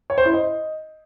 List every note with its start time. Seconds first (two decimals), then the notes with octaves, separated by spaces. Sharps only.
0.10 C#5
0.18 C5
0.26 E4
0.33 D#5